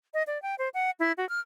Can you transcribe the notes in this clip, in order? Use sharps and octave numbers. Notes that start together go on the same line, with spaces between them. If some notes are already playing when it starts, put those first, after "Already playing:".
D#5
D5
G5
C5
F#5
E4
F#4
F6